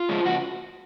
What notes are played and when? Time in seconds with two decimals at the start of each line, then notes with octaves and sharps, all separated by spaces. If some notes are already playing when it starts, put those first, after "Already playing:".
Already playing: F4
0.09 F3 G#3
0.25 C#3 F#4